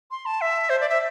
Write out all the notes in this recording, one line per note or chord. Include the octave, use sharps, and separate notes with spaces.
C6
A5
E5
C5
D5
E5